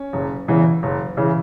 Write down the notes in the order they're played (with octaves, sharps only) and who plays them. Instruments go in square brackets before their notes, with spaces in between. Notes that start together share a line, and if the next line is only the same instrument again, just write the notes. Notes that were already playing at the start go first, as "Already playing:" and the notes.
Already playing: [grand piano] C#4
F#1
E2 C#3 E3
F#1
C#3 E3